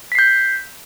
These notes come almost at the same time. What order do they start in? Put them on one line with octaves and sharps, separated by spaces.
B6 C7 G6